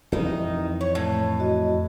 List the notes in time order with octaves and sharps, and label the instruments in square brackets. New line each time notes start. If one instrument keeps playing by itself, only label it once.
[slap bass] F2 E3 [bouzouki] D#3 D#4
[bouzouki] C#5
A2
[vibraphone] F#4 D#5